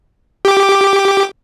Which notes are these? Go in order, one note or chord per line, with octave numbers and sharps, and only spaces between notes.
G4 D6